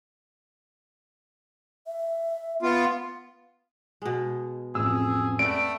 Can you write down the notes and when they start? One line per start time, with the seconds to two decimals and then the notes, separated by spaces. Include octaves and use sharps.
1.87 E5
2.62 B3 F4
4.02 B2 G#3
4.75 A1 F2 G#4 E6
5.39 A3 B3 C4 D5 D7